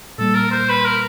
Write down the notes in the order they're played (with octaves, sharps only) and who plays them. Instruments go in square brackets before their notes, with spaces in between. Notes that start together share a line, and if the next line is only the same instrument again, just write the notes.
[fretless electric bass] A#2 G3 A#3 [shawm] A4
[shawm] A#4
C5
B4
A#4